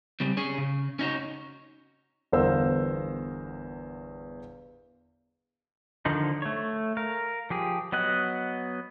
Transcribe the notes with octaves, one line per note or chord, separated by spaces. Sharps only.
C#3 G3 C4
C#4 G#4 C#5
C#3
C#4 D#4 F#4 C#5
G1 E2 A#4 C5 F5 E6
D3 D#3 F3 D#4
A3 C#5
A#4 F5
F3 G4 G#4
F#3 B3 D#5 F#5